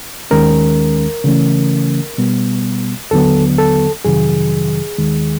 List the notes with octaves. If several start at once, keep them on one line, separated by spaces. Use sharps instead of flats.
D#2 D#3 G#3 C#4 A#4
C#3 E3 A3 C#4
B2 G3 B3
D#2 D3 F#3 B3 A4
A4
F2 C3 D#3 F#3 G#4
D#2 D#3 G#3